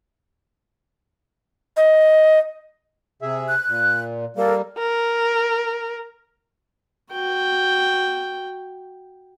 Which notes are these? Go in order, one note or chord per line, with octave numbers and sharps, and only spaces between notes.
D#5
C3 G#4 E5
F#6
A#2
G3 A#3 A4 A#4
A#4
F#4 G5